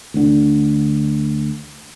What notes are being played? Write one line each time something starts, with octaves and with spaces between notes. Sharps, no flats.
D2 D3